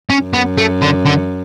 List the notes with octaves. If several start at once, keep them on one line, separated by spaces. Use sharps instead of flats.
C#4
F#2
B3
A3
D3
D3